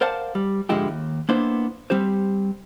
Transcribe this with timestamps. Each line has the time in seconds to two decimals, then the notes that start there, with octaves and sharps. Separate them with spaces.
0.01 A#4 C5 D5 F5 F#5 A5
0.35 G3
0.69 G#2 D3 F3 G#3 E4 G4
0.88 D#2
1.29 A#3 B3 D4 E4 C5
1.90 G3 C4 G4 C5